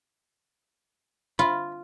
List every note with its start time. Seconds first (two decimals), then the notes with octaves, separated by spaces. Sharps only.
1.39 F4 B5